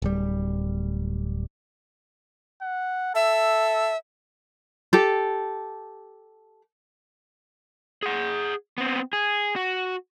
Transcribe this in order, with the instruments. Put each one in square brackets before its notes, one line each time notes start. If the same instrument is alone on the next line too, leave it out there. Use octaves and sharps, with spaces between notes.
[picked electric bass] D1 G3
[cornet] F#5
[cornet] A4 [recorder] E5
[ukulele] G4 A4
[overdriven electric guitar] G#4 F#5
B3 C4
G#4
F#4